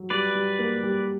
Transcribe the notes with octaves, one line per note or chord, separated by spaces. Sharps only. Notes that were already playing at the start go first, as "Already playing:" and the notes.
Already playing: F#3
G3 B4 D5
G3
A#3
G3